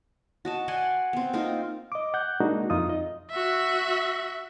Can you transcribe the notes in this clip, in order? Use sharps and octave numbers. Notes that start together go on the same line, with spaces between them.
F#4 D#5 A5
D5 F#5 G#5 C6
B3 C4
A#3 C4 D#4 F4
D#5 D6
F#5 F#6 G6
G#3 A#3 D4 D#4 F#4
F2 D#4 F4 D#6
D#5
F#4 E5